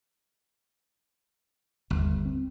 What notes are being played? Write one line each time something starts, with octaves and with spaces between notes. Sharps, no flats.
G1 D#2
C4